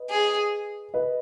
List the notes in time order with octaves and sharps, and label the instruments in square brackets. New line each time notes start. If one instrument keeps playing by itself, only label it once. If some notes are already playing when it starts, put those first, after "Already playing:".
Already playing: [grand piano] B4 D#5
[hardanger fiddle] G#4
[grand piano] B4 D#5